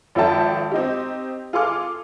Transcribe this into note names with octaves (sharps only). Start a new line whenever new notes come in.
G#1 F3 A4 E5 G5 A5
C4 D#4 G4
F4 G#4 A4 C6 D6 F6